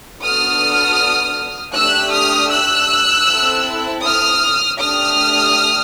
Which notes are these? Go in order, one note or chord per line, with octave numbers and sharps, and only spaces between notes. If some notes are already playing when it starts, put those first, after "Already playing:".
B3 D4 F#4 A4 D#6 F6
A3 D4 G4 E6 F#6
D#6 F6
E6 F#6
C4 E4 A4
D#6 F6
A3 D4 G4 D#6 F6